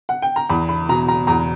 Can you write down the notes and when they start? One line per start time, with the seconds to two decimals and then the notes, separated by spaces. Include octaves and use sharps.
0.09 F#5
0.22 G5
0.36 A#5
0.50 E2 B5
0.69 B5
0.89 B2 A#5
1.08 A#5
1.27 E2 A#5